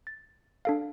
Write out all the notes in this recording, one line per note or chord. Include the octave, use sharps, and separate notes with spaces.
A6
D4 A4 F5